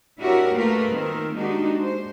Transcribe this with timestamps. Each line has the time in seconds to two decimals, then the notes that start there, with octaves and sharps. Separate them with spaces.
0.19 D4 E4 F#4 G4 A#4 C#5
0.55 A3 A#3 F4 A#4 B4
0.91 D#3 C4 A#4
1.36 G#3 A#3 D4 D#4 F#4 G4
1.79 C5